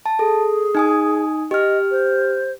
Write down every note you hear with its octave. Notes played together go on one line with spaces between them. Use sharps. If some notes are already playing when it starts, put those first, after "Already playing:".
A5
G#4 A4
D#4 G#5 D#6
G4 D#5 F6
C5